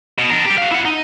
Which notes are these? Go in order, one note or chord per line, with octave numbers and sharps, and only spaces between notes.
B2
D4 A#4
G3 G4
F#4 F5
E4 F#5
D#4